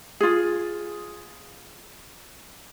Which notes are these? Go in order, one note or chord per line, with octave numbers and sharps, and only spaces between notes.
F4 G#4